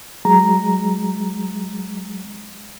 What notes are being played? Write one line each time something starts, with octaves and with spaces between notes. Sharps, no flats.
F#3 G#3 A#5